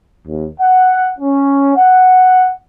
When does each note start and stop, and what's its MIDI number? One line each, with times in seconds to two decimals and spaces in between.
0.26 0.47 39
0.60 1.09 78
1.19 1.74 61
1.76 2.52 78